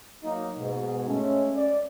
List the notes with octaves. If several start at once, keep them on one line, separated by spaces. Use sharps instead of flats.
F#3 A#3 D#4
G#2 B2
G#3 A3 C#4
D5